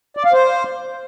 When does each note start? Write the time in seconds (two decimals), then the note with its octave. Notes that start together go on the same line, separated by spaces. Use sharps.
0.17 D5
0.25 F5
0.33 C5